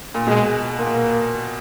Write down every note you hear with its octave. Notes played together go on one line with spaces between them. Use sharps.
A#2
B2 G#3
A#2 A#3